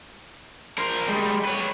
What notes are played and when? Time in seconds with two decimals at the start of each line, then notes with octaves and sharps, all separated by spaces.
0.78 A#4 C5
1.09 G3 G#3
1.44 B4 C#5